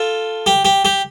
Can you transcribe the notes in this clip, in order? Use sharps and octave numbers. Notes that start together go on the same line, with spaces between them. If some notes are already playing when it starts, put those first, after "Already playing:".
Already playing: F4 A4
G4
G4
G4